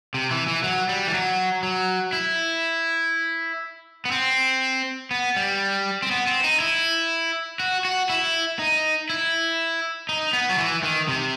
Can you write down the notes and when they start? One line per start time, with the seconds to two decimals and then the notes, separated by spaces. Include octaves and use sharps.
0.14 C3
0.31 E3
0.47 E3
0.64 F#3
0.89 G3
1.07 E3
1.14 F#3
1.63 F#3
2.13 E4
4.05 B3
4.11 C4
5.11 B3
5.36 G3
6.02 C4
6.11 B3
6.27 C4
6.44 D#4
6.60 E4
7.60 F#4
7.85 F#4
8.09 E4
8.59 D#4
9.10 E4
10.09 D#4
10.33 B3
10.50 F#3
10.58 E3
10.83 D#3
11.08 C3